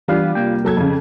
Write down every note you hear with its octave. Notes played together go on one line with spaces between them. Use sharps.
E3 G3 B3 D4 F4 F5
C2 A#3 G5
F#3 A4 G#6
F2 C#3